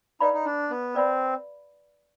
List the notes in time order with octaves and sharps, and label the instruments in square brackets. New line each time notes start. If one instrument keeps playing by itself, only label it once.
[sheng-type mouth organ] D#4 [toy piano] B4 D5 F5 B5
[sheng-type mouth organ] D#4
D4
B3
[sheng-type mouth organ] C4 [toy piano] B4 D5 F5 B5